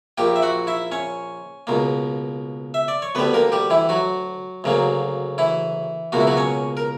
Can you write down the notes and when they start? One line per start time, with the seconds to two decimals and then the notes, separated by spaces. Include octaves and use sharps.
0.18 A#1 A#2 A#3 G4 G5
0.36 E5
0.42 F#4 F#5
0.67 E4 E5
0.92 C#4 C#5
1.67 C#2 B2 A#3
2.74 E5
2.88 D5
3.02 C#5
3.15 D2 D3 G3 B3 B4
3.34 A#3 A#4
3.52 G3 G4
3.70 E3 E4
3.89 F#3 F#4
4.64 D2 C#3 F#3 A#3
5.38 E3 E4
6.12 C#2 B2 A#3 F#4
6.20 E4
6.27 F#3 F#4
6.37 C#4 C#5
6.77 A#4